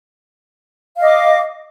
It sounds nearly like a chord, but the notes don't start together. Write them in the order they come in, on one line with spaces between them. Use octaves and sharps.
F5 D#5 D6